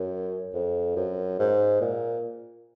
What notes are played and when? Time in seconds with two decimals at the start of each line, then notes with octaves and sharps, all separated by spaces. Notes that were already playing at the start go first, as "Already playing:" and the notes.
Already playing: F#2
0.54 F2
0.96 F#2
1.39 G#2
1.81 A#2